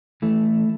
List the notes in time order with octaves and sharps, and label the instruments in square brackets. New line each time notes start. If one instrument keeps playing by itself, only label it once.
[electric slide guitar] E3 A3